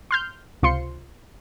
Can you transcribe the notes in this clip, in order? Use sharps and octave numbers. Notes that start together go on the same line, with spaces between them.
C6 F6 G6
C#2 C3 F4 C5 C6 C#7